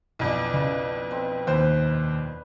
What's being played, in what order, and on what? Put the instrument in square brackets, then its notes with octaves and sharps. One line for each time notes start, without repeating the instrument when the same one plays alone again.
[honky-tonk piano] B1 F2 [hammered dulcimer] E3 D4
[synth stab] C#3 [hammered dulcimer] B4
[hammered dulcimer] C4 B4
[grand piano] D#2 C5 [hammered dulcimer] B4